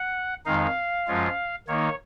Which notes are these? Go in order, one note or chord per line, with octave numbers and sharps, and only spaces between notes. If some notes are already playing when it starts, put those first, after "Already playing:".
Already playing: F#5
F2 D#3 G#3 D#4 F5
F#2 F3 G#3 C#4 F4
D#3 A#3 D#4 C#5